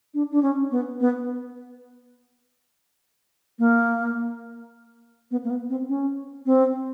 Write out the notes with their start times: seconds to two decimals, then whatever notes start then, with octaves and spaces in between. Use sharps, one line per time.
0.14 D4
0.31 D4
0.43 C#4
0.71 B3
1.00 B3
3.59 A#3
5.31 B3
5.44 A#3
5.50 B3
5.70 C4
5.88 C#4
6.46 C4